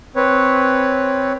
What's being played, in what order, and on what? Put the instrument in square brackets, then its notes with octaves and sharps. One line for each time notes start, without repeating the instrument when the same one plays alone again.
[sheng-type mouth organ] C4 B4 C#5